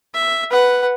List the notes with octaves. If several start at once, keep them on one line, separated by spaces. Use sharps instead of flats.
E5
B4 F#5